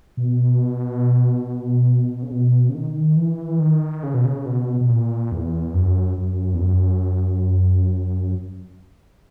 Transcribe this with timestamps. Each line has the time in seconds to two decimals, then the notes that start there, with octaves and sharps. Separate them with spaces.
0.17 B2
2.23 C#3
2.32 B2
2.69 C#3
2.75 D#3
3.16 E3
3.59 D#3
4.03 C#3
4.14 B2
4.25 C#3
4.46 B2
4.81 B2
4.89 A#2
5.32 E2
5.74 F#2
6.17 F#2
6.54 E2
6.60 F#2